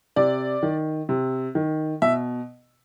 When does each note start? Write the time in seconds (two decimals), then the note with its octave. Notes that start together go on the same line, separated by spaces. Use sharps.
0.16 C3 D5
0.63 D#3
1.09 C3
1.55 D#3
2.02 B2 E5